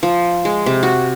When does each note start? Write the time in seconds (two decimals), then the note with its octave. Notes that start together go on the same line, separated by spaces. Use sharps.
0.03 F3
0.45 G#3
0.66 C3
0.83 F#4